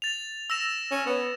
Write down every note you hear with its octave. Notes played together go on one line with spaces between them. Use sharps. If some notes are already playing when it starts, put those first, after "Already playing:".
A6 F7
E6 A#6 E7
C#4
B3